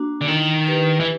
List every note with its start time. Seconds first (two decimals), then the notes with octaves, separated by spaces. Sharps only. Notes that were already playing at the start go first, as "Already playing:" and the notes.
Already playing: A#3 D4 F#4
0.21 D3
0.28 D#3 E4
0.67 G4 B4
1.00 E3